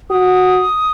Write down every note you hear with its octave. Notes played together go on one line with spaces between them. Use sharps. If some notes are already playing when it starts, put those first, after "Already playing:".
F#4 D#6